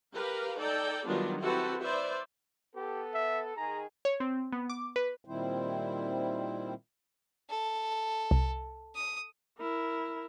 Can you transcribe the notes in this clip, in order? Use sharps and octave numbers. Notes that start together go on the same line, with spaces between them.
G4 A#4 B4 F5
D#4 A4 D5 G5
D#3 F#3 G3 B3 D4 F4
C4 E4 F#4 G4 A4 B4
B4 C5 D5 E5
B3 G4 A4
E5
D#3 G#4 A#5
C#5
C4
B3
D6
B4
A#2 D#3 G3 C4 E4 C5
A4
C2
D#6
E4 A#4